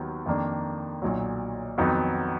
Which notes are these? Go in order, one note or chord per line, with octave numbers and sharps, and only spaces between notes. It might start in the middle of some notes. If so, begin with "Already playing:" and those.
Already playing: D#2 D#3 F#3 B3
F2 D#3 A#3 D4
B1 A#2 F#3
F2 D#3 F#3 B3 D#4